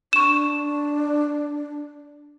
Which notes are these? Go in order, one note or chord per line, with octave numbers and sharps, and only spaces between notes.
D4 C#6 E7